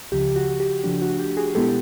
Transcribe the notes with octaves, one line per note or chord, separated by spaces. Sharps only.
C#2 C#3 F3 G4
F#4
F#4
G4
C#3 F3 A3 D4 G4
F#4
G4
F#4 G#4
B2 G#3 B3 E4 G4 A4